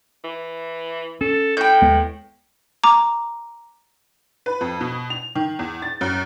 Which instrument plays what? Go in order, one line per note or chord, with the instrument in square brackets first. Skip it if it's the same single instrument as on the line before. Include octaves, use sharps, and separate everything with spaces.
[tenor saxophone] E3
[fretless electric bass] C#4 [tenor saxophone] A4
[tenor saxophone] A2 [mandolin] G5 G6
[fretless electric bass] D#2 G#3 B3
[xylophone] A#5 D6
[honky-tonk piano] B4
F2
B2
F7
D#3
E2
A6
F#2